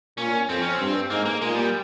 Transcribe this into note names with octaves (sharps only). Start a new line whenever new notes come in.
A#2 C#4
F2 C4
C#4
C4
G2
G#2 A#3
A#3
A#2 G#3
G3